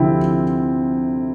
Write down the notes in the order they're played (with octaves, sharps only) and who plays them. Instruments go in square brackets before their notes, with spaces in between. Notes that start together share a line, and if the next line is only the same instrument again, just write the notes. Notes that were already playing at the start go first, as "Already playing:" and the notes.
Already playing: [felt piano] D2 C3 F3 C4 E4